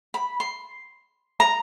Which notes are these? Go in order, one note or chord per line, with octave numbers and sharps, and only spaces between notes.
B5
C6
A#5